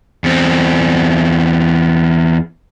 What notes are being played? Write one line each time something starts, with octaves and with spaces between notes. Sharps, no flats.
E2 C4